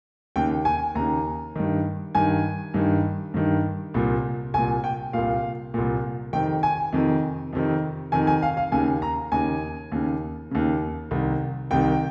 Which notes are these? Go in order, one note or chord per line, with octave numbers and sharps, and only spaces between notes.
D#2 C#3 G5
G#5
D#2 C#3 A#5
G2 D#3
G2 D#3 G#5
G2 D#3
G2 D#3
C2 A#2
C2 A#2 G#5
G5
C2 A#2 F5
C2 A#2
F2 C3 D#3 G5
G#5
F2 C3 D#3
F2 C3 D#3
F2 C3 D#3 G#5
G#5
F5
F5
D#2 C#3 G#5
A#5
D#2 C#3 G#5
D#2 C#3
D#2 C#3
C2 C3 D#3
C2 C3 D#3 G5